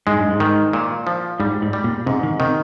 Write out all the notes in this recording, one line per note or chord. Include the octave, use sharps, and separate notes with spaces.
G#2 G#3
G2
G#2
D#3
A#2
F3
G#2 G3
G#2
G3
A#2
G#2 C3
D#3
C3 D#3